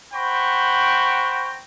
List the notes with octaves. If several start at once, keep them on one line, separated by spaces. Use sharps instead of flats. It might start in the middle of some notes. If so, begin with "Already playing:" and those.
C5 F#5 G5 A#5 B5 C#6